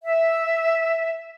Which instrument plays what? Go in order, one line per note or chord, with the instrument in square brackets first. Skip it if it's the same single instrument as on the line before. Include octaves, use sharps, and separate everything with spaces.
[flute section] E5